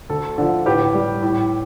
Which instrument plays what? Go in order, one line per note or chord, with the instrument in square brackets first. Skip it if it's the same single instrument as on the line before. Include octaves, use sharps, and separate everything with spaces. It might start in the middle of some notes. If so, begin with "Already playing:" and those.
[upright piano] D2 A4
D3 F3 A4
A2 G4 B4
G3
A2